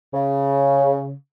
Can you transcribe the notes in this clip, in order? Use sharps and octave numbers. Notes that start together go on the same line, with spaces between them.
C#3